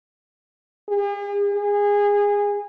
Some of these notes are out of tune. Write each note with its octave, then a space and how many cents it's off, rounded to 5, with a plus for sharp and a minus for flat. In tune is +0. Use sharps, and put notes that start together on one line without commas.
G#4 -45
G#4 -20